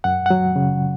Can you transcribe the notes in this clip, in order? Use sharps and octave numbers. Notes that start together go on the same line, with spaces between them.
F#2 F#5
F#3 F#5
C#3